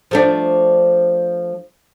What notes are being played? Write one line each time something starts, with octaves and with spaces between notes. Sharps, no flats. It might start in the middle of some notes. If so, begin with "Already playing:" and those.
F3 A3 D4